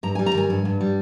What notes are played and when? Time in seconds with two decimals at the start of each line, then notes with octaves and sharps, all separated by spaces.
0.03 G2 A#5
0.15 G#5
0.19 G3
0.26 A#5
0.34 D#3 G#5
0.50 G2
0.65 G2
0.81 G3